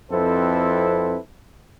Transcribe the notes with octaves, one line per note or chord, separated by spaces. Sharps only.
F2 C4 E4 A4 B4 C5